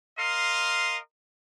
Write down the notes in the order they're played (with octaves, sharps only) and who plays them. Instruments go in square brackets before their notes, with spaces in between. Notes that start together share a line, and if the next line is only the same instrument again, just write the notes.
[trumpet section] A#4 D#5 F5 C6